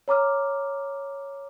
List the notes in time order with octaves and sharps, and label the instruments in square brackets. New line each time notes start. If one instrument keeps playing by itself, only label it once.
[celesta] C#5 A#5 D6 F6